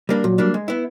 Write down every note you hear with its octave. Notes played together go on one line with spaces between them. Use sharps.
G3 A#3 D4
A#2 F#3
G3 A#3 D4
G#3
B3 E4